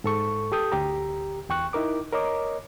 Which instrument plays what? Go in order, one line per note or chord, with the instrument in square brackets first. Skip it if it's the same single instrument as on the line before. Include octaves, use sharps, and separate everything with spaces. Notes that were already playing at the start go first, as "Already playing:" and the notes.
[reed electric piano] G#2 A4 C#6
G4 A4 D#6 G6
D2 G4 A#5
E2 G5 C#6 F#6
D#4 E4 A#4 D6
A#4 C#5 D#5 A#5 D6